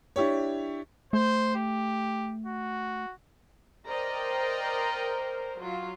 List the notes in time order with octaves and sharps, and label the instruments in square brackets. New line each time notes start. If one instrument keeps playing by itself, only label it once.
[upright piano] D4 E4 G4 C#5
[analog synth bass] A3 [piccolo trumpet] C5
[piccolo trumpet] G4
F#4
[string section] A#4 C5 D5 D#5 G5 A#5
F#3 F4